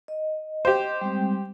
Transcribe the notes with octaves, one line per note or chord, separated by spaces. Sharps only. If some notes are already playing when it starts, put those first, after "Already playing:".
D#5
G4 C5
G3 G#3 C4